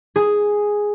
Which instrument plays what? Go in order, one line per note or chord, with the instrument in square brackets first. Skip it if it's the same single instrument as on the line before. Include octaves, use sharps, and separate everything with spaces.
[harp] G#4